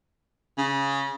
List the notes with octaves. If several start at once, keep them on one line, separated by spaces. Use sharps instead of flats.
C#3